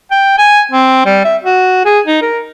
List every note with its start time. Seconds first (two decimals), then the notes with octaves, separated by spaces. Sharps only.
0.11 G5
0.38 G#5
0.71 C4
1.06 G3
1.25 E5
1.44 F#4
1.85 G#4
2.06 D#4
2.22 A#4